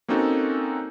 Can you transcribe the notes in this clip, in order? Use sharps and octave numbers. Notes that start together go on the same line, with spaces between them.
A#3 C4 C#4 D#4 F#4 A4